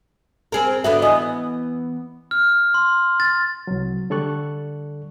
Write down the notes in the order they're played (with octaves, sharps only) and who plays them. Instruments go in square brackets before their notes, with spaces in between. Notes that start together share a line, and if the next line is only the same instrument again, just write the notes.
[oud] C4 G#4 A#4
[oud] D3 B3 F#4 [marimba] E5
[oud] E3 B3 [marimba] D#5 G#5 D#6
[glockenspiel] F6
C6
A6
[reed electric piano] C2 F#3
D3 G3 A4 D5 C#6 F#6